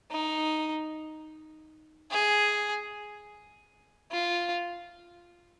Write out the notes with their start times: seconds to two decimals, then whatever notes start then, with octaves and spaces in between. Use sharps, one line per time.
0.11 D#4
2.11 G#4
4.11 F4